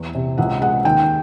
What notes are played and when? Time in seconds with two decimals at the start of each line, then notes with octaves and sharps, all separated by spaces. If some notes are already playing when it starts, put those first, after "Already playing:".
Already playing: E2 E3 C5
0.15 C3
0.38 C#2 F#5
0.62 G#3 F#5
0.84 D#2 G5